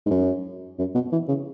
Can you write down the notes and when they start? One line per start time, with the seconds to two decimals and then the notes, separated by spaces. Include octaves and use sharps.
0.06 G#2
0.11 F#2
0.78 F#2
0.94 B2
1.12 E3
1.28 C#3